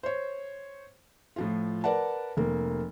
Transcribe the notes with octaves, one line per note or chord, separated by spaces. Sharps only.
C5 C#5
A2 F3 F4
A#4 B4 D5 F#5 A5
F1 A#3